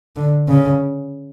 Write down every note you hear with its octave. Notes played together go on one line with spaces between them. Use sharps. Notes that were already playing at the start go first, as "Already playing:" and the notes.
D3
C#3